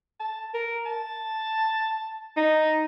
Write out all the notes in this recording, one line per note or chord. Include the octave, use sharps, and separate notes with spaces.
A5
A#4
A5
D#4